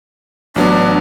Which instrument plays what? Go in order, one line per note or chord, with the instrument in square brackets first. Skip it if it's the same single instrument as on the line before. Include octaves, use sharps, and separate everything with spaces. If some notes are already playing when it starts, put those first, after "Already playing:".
[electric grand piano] A1 F#3 B3 [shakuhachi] D4